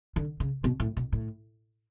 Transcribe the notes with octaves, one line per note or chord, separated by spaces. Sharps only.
D3
C#3
B2
A2
B2
A2